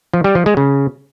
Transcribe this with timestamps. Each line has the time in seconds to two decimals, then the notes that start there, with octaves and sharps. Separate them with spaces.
0.14 F3
0.24 G3
0.35 F3
0.46 G#3
0.57 C#3